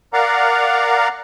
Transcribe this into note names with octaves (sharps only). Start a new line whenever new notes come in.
A#4 D5 F5 F#5 A#5